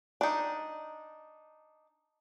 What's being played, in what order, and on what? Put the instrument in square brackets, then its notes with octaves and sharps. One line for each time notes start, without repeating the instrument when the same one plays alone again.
[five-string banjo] D4 D#4